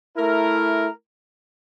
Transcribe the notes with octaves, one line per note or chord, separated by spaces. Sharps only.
A3 E4 A#4